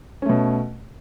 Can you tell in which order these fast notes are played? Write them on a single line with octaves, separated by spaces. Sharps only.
C#4 A3 B2